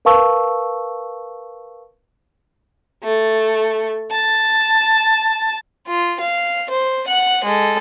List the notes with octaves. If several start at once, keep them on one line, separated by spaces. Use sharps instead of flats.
A#4 B4 F5 A5 C#6 E6
A3
A5
F4
F5
C5
F#5 F#6
G#3 A4